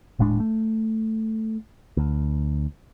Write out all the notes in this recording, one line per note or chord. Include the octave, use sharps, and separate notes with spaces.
D#1 A2 G#3 D4
A3
D2